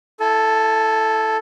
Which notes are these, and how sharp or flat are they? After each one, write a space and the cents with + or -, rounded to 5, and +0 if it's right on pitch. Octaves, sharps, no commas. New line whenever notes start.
E4 +10 A4 +0 A5 -45